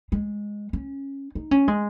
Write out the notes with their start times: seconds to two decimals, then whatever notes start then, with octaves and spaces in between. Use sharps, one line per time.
0.12 G#3
0.73 C#4
1.35 D#4
1.51 C#4
1.68 G#3